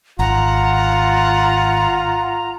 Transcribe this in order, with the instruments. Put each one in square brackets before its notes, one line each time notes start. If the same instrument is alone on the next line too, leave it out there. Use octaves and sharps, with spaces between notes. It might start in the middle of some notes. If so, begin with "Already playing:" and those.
[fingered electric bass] G#1 [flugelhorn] F4 [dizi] F#5 [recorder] A#5